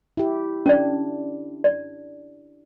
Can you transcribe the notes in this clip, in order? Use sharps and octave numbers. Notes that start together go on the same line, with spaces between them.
E4 G4
C#4 D4 D5
D5